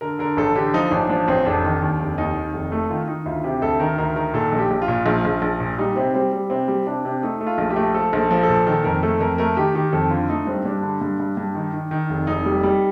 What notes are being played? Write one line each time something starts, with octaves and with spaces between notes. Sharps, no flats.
D3 A#4
D3 A#4
A1 A4
D3 G4
F3 D#4
A1 D4
F3 D4
A1 C4
F1 D4
D#3
D#2
F1
D#2 D#4
D#3
F1
A3
D#3 F4
D#3 D#4
D2 F4
C3 G4
D2 A4
D#3 A#4
D2 A#4
D#3 A#4
A#2 A4
A#1
G4
A#1
F4
A#2
A#1
A#1
A#1
A#2
G3 D#4
C3 C4
G3 C4
G3
C3 C4
G3
C3 D4
C3
A3 D#4
A3
F4
A#1
G4
A3
F3 A4
A#1
A4
F3
A4
A#2
D#3 A4
F2 A#4
A3 A4
F2 A#4
A3 A#4
D#3 G4
D#3 G4
F2 A4
D3 F4
A3 D#4
G2 C4
G2 D4
D3
G2
G2
G2
D#3
D#3
D#3
F1
F1 D#4
G3
G3